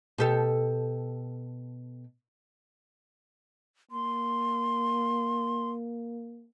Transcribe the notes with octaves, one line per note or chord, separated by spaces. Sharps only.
B2 G4 A4
A#3 C6